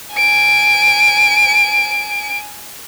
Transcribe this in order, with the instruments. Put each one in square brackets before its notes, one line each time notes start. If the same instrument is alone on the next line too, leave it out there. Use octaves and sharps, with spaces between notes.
[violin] G#5 D7